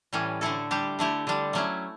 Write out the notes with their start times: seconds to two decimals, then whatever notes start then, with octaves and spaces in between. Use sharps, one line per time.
0.13 A2 E3 G3 C#4
0.41 D3 A3 E4 A4
0.71 G3 D4 G4
0.99 D3 A3 E4 G4
1.27 D3 G3 D4
1.53 F#3 A3 C#4 E4